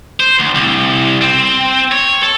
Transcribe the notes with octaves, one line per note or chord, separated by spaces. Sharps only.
C5
D2
C2
C4
C#5
A4